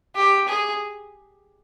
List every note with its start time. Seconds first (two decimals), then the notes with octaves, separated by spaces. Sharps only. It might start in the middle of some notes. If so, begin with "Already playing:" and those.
0.16 G4
0.48 G#4